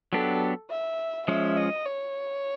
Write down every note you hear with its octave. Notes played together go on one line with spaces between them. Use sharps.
F#3 B3 D4 G4 A4
E5
F3 G#3 C#4 E5
D#5
C#5